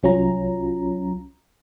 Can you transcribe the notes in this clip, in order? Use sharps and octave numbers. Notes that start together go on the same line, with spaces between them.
C2 F#3 C#4 F4 A#5